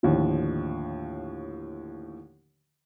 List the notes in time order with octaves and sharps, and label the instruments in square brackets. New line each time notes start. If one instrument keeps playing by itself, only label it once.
[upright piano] D#2 A2 D3 F3